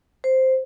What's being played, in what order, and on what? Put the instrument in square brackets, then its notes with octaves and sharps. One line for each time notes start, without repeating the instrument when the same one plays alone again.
[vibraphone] C5